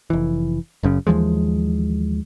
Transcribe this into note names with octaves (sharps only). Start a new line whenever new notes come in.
F1 E3
F#1 F#2 C#3
D#2 E3 F3 G#3